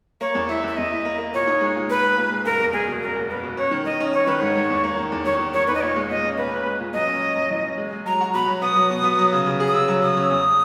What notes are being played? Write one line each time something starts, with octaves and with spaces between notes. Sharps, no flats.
A#3 C#5
E2
E4 E5
E2 E5
E2 D#5
E4
A#3
A#3
A#2 C#5
D#4
G#3
A#2
G#3 B4
G#3
A#2
G#3
F#1 A#4
E2
F#1 G#4
B2
F#1 A#4
F#1
F#1 B4
B2
C#4 C#5
D#3
D#3 D#5
C#4
C#4 C#5
D#3 B4
G#2 C#5
G#2
E2
A#3
D#3
E2
D#3 C#5
D#3
D#3 C#5
E2 B4
D#5
A#2 C#5
G#3
A#2 D#5
C#4
A#2 B4
C#4
G#3
A#2
F#2 D#5
C#4
C#4
F#2
E3
C#4
G#3
G#3
F#3 A#5
F#4
B2 B5
F#3
B3 D#6
F#3
B2
B3
F#3
C#3
C#3
G#4
D#6
C#3 E6
F#3
C#3 D#6
C#4
E6
E2 D#6